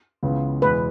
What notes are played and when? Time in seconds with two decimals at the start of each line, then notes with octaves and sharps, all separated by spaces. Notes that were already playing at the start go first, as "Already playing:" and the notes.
0.23 C#2 C#3 E3 B3
0.62 E2 B2 G#3 B4